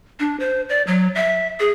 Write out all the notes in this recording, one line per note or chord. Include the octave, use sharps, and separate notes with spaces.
D4
C5
D5
F#3
E5
G#4